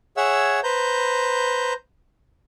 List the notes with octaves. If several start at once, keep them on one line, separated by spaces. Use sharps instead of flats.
G#4 C#5 E5 F#5 E6
B4 C5 A#5 G6